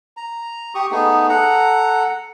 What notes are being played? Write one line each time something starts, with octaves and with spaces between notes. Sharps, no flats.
A#5
G4 C#6 D#6
A3 B3 D#4 G#4
A4 F#5 A#5